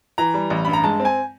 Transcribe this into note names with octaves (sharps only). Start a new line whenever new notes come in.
E3 A#5
G3
A1
G2 B5
A#5
G#3 A5
C4
G#5